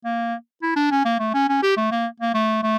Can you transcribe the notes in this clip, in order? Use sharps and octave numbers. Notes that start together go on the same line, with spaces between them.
A#3
E4
D4
C#4
A#3
A3
C#4
C#4
G4
A3
A#3
A#3
A3
A3